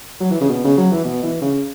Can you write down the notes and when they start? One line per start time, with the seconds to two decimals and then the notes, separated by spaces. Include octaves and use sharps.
0.20 F#3
0.31 E3
0.41 C#3
0.49 B2
0.64 C#3
0.78 F#3
0.92 E3
1.04 B2
1.23 E3
1.41 C#3